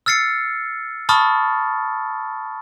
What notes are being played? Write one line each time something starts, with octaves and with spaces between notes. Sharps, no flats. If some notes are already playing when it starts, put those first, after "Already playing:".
E6 F6 A6 C7 C#7
A5 B5 C#6 D#6 F6 A6